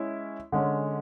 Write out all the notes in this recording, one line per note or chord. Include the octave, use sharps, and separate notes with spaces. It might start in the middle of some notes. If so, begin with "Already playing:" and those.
Already playing: G#3 C#4 E4
D3 G#3 C#4